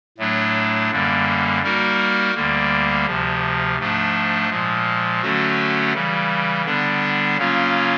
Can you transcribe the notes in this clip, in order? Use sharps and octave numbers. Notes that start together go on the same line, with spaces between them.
A2 F#3 A3 D4
F#2 D3 G3 A#3
G3 A#3 D#4 F#4 A#4
D2 D3 G3 A#3
D2 C3 F3
G#2 F3 A3 D4
A#2 F3 G#3
D3 F#3 A3 C#4 F#4
C#3 E3 G3
D3 G3 B3 D4
C#3 F#3 A#3 C#4 F4